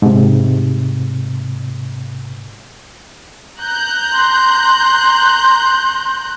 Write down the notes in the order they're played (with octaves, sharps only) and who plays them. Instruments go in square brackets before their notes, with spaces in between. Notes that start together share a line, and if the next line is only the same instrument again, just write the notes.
[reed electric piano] G#2 C3
[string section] A#5 F#6 G6
[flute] C6